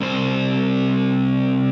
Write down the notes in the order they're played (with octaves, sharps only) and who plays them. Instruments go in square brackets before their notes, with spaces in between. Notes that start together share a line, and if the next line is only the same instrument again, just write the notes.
[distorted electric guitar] C2 C5